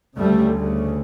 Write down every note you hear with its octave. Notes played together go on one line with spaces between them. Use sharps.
D2 C#3 G3 A3